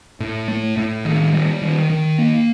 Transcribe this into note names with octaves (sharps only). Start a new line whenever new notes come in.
A2
A3
A2
D#3
G3
D#3
D#3
A#3